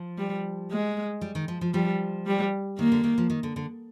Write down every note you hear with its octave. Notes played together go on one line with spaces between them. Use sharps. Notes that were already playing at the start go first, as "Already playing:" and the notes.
Already playing: F3
G3
G#3
G3
D#3
F3
F3
F3 G3
G3
D#3 A#3
D3
D#3
F3
D#3
D3
D3